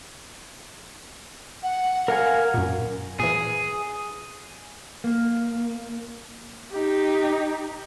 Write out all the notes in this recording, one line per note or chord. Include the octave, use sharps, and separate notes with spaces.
F#5
A#4 F5 G#5
F#2 A#2
A#2 E3 G#4
A#3
D#4 G4